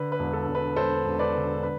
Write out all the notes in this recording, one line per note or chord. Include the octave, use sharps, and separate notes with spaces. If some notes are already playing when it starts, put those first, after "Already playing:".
Already playing: D3 B4
B4
E1
A4
E1
B4
E1 A4 C5
E1
B4 D5
D3
B4